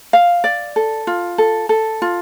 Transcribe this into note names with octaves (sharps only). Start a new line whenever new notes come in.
F5
D5
A4
F4
A4
A4
F4